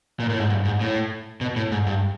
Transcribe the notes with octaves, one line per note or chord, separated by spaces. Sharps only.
A#2
A2
G#2
G2
G#2
A2
B2
A2
G#2
G2